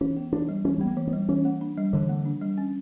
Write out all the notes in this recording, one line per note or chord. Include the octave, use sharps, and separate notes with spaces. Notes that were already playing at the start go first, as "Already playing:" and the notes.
E3 C#4
B3
E3 D4
G3
E3 C#4
G3
B3
A#3
E3
B3
G3
E3 C#4
A#3
D4
G3
D3 E3
A#3
D4
G3
C#4